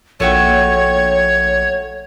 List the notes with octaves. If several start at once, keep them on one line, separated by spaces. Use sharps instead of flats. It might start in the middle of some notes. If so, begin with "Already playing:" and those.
A#1 A3 F#4 C#5 G5